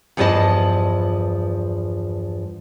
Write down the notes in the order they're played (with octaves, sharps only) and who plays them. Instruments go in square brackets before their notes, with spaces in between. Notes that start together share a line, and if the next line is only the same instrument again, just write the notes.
[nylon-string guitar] E2 G2 F3 B4 D#5 A5